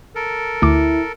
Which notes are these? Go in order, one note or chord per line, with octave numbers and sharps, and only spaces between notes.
A4 A#4
D2 E4 D6